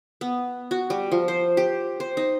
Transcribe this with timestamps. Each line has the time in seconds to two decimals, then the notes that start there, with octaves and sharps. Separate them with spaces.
0.21 B3
0.71 F#4
0.90 G3
1.12 F3
1.28 C5
1.57 G4
2.00 C5
2.17 D#4